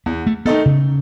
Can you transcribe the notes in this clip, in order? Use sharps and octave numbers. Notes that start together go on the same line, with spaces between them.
E2 B3
A3
D#3 A3 B3 D#4 A4
C#3